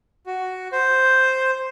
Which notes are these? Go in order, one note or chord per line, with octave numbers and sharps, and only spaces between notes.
F#4
C5